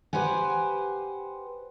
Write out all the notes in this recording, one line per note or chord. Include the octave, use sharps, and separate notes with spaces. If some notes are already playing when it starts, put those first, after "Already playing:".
G4 B4 C5 F#5 G#5